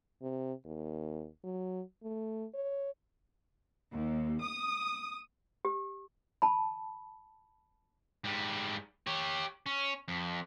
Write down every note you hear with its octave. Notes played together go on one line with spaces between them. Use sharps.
C3
D#2
F#3
A3
C#5
D#2
D#6
G4
A5 B5
G#2 G3
G4 C#5
C#4
F2